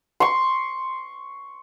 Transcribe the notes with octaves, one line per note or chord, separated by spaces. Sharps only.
C6 C#6